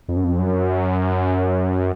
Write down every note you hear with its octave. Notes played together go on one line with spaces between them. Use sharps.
F2
F#2
F2
F#2